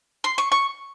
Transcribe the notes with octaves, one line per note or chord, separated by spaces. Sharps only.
C6
C#6
C#6